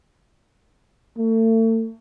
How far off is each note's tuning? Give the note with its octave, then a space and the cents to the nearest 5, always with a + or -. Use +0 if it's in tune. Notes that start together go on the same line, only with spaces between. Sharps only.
A3 +35